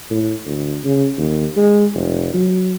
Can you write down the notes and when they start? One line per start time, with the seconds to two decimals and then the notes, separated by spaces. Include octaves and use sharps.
0.11 A2
0.46 D2
0.84 C#3
1.18 D#2
1.56 G#3
1.94 F1
2.34 F#3